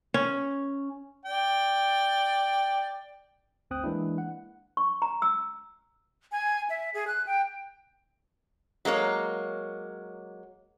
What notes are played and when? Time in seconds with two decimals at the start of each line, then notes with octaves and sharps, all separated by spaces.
0.14 C#4
1.25 D5 G5
3.70 G1 D2 C4 G5 D#6 F#6
3.84 E3 G#3 A#3 D4 E4
4.18 F#5
4.77 C#6
5.02 A#5
5.22 E6
6.32 G#5
6.70 E5
6.94 G#4
7.07 F#6
7.27 G5
8.85 F#3 G#3 A#3 C#5